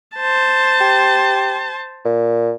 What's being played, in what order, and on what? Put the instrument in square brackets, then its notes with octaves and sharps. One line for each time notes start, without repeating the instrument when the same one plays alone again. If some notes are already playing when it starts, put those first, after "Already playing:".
[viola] C5 A5
[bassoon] G4
A#2